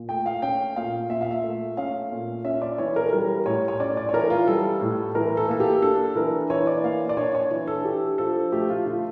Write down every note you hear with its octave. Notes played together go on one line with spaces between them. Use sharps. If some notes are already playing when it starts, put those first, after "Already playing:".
Already playing: A#2
A3 G5
F5
C#4 G5
A#2 F5
A#2 E5
F5
E5
A3
C#4 F5
A#2
C#4 E5
D5
E3 C#5
A#4
G3 A#4
A2 C#5
C#5
C#4 D5
D5
C#5
E3 A#4
F4
G3 A4
A2
E3 A#4
A4
A#3 A4
G4
D4 A4
E3 A#4
E3 C#5
D5
A#3 F5
D5
D4 C#5
C#5
E3
A4
D4 G4
F3 A4
A3 G4
F4
D3 F4